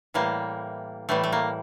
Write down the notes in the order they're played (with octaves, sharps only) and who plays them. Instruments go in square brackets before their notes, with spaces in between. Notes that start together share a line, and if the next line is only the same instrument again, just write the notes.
[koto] A2 E3 G3 A#3
A2 E3 G3 A3
A3
A#3